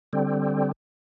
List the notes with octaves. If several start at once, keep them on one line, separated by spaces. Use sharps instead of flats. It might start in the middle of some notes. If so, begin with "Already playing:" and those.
D3 G3 C4